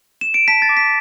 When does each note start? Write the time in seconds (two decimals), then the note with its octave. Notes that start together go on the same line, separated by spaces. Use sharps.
0.21 E7
0.34 D7
0.48 A5 B6
0.62 A6
0.69 D6
0.77 B6